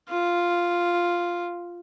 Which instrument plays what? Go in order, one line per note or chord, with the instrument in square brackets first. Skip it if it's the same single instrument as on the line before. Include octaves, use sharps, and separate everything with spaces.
[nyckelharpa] F4